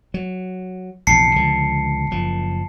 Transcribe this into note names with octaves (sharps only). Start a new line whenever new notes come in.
F#3
A#1 E2 C3 A5 C7 C#7
C#2 D3 F3
F#1 F3